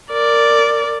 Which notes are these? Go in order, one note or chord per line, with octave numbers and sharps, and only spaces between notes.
A#4 D5